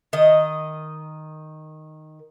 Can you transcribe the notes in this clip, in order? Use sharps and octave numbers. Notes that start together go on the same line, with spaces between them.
D#3 D#5